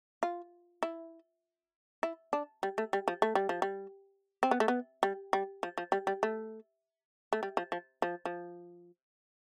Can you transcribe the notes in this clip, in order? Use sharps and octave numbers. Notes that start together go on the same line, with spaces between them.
F4
E4
E4
D4
G3
A3
G3
F3
A3
G3
F3
G3
C4
B3
A3
B3
G3
G3
F3
F3
G3
G3
A3
A3
G3
F3
F3
F3
F3